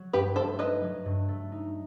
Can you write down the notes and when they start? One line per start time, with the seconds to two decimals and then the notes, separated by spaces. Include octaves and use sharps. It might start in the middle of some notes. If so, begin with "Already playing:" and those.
Already playing: F#3
0.13 G2 G4 B4
0.36 A3 A4 C5
0.59 D#4 B4 D#5
0.83 F#3
1.06 G2
1.28 A3
1.52 D#4